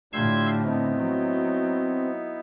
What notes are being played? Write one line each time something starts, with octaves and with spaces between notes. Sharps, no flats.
A2 D3 D4 F4 G4 C6 E6 G#6
B3 C4 D#4 E4
F#3